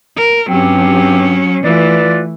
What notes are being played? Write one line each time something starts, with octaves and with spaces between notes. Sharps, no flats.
A#4
G2 F#3 C4 C#4 G4
E3 A3 F4 B4 D5